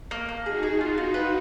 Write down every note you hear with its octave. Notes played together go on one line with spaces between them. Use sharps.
A#3
A#3
D#4 F#4 G#4
G#4
D#4 F4 F#4
F4
B4